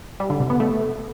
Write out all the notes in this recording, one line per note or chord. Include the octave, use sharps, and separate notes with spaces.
G3
D3
C3
B3
A3